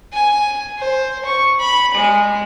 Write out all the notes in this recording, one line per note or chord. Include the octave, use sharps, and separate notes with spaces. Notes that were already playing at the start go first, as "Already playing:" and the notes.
G#5
C5
C#6
B5
G#3